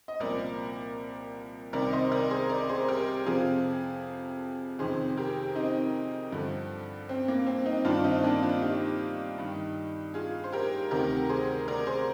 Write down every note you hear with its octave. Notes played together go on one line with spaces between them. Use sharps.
D#5
C2 A#2 F3 A#4 D5
C2 C3 D#3 A#4 D5
C5 D#5
A#4 D5
G#4 C5
A#4 D5
G#4 C5
G4 A#4
F2 C3 F3 F4 G#4
F2 C3 D#3 G#4 C5
G4 A#4
C4 D#4
G2 D3 F3
C4
A#3
C4
C4 D#4
G2 D#3 D4 F4
C4 D#4
A#3 D4
D4 F4
D#4 G4
G2 D#3
F4 G#4
C5
G4 A#4
D2 C3 D#3 G4 A#4
G#4 C5
A#4 D5
G#4 C5